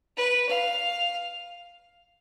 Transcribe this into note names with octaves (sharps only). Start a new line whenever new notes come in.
B4
F5